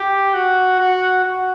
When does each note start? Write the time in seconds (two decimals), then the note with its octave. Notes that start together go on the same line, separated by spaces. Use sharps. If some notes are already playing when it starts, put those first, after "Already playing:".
Already playing: G4
0.34 F#4
0.79 F#4
1.24 F#4